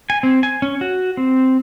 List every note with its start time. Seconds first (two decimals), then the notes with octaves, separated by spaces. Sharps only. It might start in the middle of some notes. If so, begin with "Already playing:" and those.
0.10 G#5
0.23 C4
0.43 G#5
0.62 C#4
0.81 F#4
1.17 C4